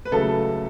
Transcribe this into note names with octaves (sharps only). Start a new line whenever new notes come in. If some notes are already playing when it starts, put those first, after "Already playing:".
B4
C#2 C#3 F#3 A3 A4